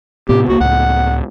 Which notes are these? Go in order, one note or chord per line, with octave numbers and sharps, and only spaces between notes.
A2 C3 B3 G4
C2 A#3 F#4
C#2 A2 F#5